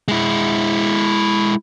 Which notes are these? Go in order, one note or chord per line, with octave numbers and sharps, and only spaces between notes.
G#3 E4